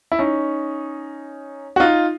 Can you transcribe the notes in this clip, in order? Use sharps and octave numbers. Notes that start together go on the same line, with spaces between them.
E4
C#4 D#4
F#4
D#4 F4